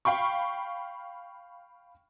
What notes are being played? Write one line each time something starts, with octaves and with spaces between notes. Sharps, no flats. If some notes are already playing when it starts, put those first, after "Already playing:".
F5 G5 B5 C#6